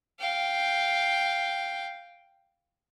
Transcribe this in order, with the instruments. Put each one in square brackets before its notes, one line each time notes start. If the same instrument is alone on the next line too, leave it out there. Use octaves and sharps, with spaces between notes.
[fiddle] F5 G5